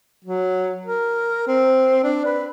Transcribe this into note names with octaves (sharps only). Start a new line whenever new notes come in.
F#3
A#4
C4
D4
B4